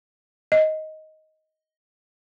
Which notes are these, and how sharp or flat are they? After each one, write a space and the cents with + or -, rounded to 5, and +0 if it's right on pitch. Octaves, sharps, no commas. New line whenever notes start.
D#5 +10